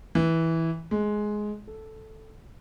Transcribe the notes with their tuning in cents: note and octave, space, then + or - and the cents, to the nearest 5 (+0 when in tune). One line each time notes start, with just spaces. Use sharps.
E3 -10
G#3 +10
A4 -5